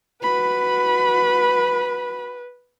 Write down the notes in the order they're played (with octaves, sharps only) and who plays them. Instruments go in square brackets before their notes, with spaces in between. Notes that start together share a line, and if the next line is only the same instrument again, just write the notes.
[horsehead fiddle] F#4 B5 [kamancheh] B4